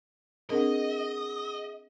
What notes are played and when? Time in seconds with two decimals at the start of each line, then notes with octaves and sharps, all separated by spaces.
0.50 C4 D4 G#4 A#4 D#5 F#5